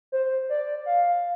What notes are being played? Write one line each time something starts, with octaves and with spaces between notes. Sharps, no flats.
C5
D5
F5